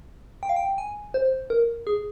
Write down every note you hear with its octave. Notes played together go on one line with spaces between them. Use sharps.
G5
F5
G5
G#5
C5
A#4
G#4